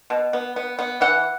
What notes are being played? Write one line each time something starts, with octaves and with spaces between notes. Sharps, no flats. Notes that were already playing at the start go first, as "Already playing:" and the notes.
B2
B3
B3
B3
E3 F#5